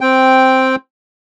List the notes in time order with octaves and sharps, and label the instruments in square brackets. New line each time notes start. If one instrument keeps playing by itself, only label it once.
[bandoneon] C4 G5